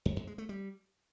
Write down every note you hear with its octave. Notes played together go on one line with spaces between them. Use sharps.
F2
F2
G#3
A3
G3